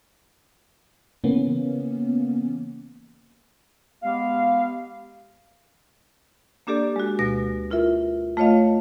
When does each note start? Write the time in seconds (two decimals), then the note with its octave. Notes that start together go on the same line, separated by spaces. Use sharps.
1.24 C#3 E3 A#3 B3 C#4
4.03 G#3 B3 G4 F5
6.67 A#3 D4 G4 A4 D5
6.96 G#3 F#4
7.19 D2 B2 G#3 A#6
7.71 E4 F4 A#4 E5
8.37 A3 F4 C#5 D#5 F5